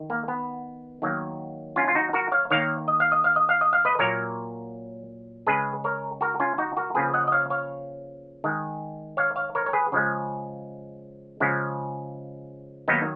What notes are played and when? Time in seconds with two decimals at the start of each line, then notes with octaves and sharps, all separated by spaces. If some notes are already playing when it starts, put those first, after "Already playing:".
Already playing: D#3
0.10 A#3
0.28 B3
1.02 D#3 F#3 A#3
1.76 C#4 F4
1.88 F4
1.95 D#4 F#4
2.13 F#4 A#4
2.32 C#5 F5
2.50 D#3 A#3 C#5 F5
2.88 D#5
3.00 F5
3.12 D#5
3.24 F5
3.36 D#5
3.49 F5
3.61 D#5
3.73 F5
3.85 B4 D#5
3.99 A#2 F#3 A#3 A#4 C#5
5.47 C#3 G#3 G#4 B4
5.84 A#4 C#5
6.21 F#4 A#4
6.40 C#4 F4
6.58 D#4 F#4
6.77 F#4 A#4
6.95 C#3 F3 A#3 G#4 B4
7.14 D#5 F#5
7.27 D#5
7.32 C#5 F5
7.50 C#5 F5
8.44 D#3 G#3
9.17 C#5 F5
9.36 C#5 F5
9.55 A#4 C#5
9.66 C#5
9.73 G#4 B4
9.92 C#3 F3 G#3
11.40 C#3 F3 G#3
12.88 D#3 F#3 A#3 B3 D#4